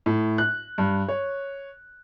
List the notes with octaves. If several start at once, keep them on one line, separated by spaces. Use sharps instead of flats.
A2
F#6
G2
C#5